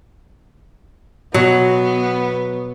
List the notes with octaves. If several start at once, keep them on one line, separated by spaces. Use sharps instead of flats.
B2 F#3 B3